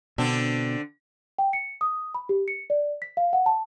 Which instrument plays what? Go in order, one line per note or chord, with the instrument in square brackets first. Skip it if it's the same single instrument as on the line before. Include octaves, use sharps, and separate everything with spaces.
[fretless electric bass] B2 [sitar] D3 C4 D4
[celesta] G5
C#7
D#6
B5
G4
C#7
D5
B6
F5
F#5
A5